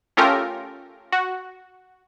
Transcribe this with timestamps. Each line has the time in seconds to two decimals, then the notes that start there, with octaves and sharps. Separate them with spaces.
0.17 A3 C#4 F4 G4 A4 A#4
1.12 F#4